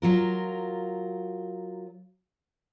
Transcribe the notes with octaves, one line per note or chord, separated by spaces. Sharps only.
F#3 F4 A#4